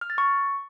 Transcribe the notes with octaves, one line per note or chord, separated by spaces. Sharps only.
F6
A6
C#6